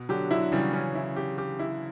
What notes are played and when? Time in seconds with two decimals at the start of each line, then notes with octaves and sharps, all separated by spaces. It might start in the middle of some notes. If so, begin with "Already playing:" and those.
Already playing: B2
0.09 D3 F#3 G4
0.31 D3 F#3 E4
0.52 C#3 E3 G3
0.73 C#4
0.95 E4
1.16 G4
1.38 G4
1.59 E4